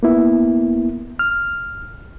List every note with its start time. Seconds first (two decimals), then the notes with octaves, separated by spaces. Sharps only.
0.03 A#3 B3 E4
1.19 F6